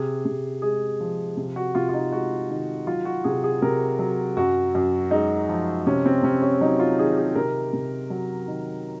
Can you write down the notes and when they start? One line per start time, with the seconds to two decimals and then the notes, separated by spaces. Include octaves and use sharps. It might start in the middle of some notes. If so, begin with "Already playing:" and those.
Already playing: C3 G#4
0.25 C3
0.62 G#3 G#4
1.00 F3
1.37 C3
1.56 F#4
1.75 C3 F4
1.89 F4
1.94 D#4
2.12 G#3 F#4
2.50 D#3
2.87 F#3 F4
3.05 F#4
3.24 C3 G#4
3.44 G#4
3.62 C3 A#4
3.99 F#3
4.37 F#2 F#4
4.75 F#2
5.11 G#3 D#4
5.49 F3
5.87 C3 C#4
6.06 C4
6.23 C3 C#4
6.42 C#4
6.61 F#3 D#4
6.80 F4
6.98 D#3 G#4
7.17 G#4
7.35 C3 A#4
7.73 C3
8.10 F#3
8.48 D#3